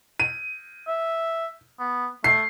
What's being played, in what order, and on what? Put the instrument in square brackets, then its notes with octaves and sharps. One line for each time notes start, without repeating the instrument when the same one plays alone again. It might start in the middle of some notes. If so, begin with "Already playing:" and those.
[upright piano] D#7
[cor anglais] E5
B3
[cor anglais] A3 [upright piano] C7